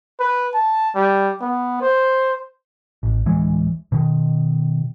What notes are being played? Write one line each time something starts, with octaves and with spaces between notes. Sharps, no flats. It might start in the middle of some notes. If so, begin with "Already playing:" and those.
B4
A5
G3
B3
C5
A1
D1 E3 G#3
B2 D#3